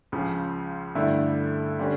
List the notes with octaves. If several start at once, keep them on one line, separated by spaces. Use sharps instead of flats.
C#2 C#3 F3
G2 D3 A3 E4
D3 G3 C#4